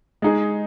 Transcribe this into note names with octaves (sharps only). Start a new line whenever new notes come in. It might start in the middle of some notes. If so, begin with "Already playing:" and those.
G#3 D#4 G#4